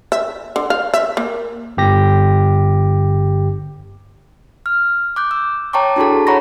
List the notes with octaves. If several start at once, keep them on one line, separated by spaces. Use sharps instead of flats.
E5
D3
F5
E5
A#3
G1 G4 A#6
F6
D6 F#6 G6
E6
C#5 G5 A5 A#5 C#6 D6
D4 E4 F#4 G#4 A4 A5
C#5 F#5 A#5 B5 C#6 A#6